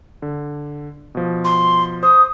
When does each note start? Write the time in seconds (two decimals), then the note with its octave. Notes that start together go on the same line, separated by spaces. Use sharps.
0.22 D3
1.15 B2 F3
1.44 C6
2.03 C5 D#6